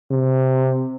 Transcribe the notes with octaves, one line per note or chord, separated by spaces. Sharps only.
C3